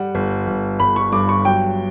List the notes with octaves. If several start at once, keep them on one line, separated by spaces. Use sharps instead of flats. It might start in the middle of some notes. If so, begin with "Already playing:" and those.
Already playing: G3 F#5
G1
G1
G1 B5
C#6
G2 D6
C#6
F#3 G5